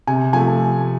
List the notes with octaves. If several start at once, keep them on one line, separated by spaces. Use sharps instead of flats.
C3 G#5
F3 A3 G#5